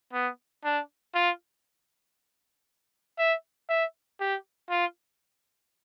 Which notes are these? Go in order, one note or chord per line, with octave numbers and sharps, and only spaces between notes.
B3
D4
F4
E5
E5
G4
F4